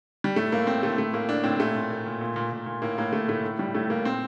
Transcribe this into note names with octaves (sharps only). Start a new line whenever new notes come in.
G3
A2 A3
A2 A#3
A2 C4
A2 A3
A2 A3
A2 A#3
A2 D4
A2 C4
A#2 A3
A#2
A#2
A#2
A#2
A#2
A#2
A#2
A2 A#3
A2 A#3
A2 A3
A2 A3
A2
A2 G3
A2 A3
A2 A#3
A#2 C4